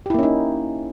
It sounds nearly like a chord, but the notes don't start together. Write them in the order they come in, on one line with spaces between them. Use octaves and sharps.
G4 E4 A#3 C#4 D#4